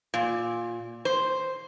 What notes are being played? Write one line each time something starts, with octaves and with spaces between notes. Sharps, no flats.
A#2
C5